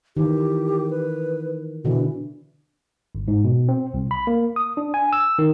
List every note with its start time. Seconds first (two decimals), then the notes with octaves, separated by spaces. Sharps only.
0.17 D#3 E3 G4
0.90 B4
1.85 B2 D3 E3
3.15 G1
3.28 G#2
3.44 B2
3.69 C4
3.94 C2
4.11 B5
4.27 A#3
4.56 D#6
4.77 D4
4.94 G#5
5.13 E6
5.39 D#3